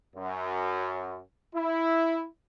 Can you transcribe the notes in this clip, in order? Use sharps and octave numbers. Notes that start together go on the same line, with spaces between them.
F#2
E4